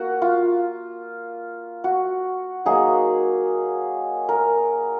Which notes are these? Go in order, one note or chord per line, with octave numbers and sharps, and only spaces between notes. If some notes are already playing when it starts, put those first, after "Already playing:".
Already playing: A#3 F#4
F4
F#4
F#3 A#3 D#4 G#4
A#4